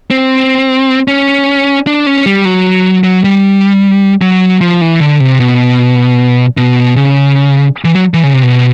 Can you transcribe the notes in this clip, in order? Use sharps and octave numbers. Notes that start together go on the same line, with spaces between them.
C4
C#4
D4
C#4
G3
F#3
F#3
G3
F#3
F3
E3
D3
C3
B2
B2
C#3
E3
F#3
E3
C#3
C3
B2